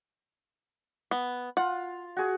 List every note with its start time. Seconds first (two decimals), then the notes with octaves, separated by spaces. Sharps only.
1.11 B3
1.57 F4 F#5
2.17 F#4 G#4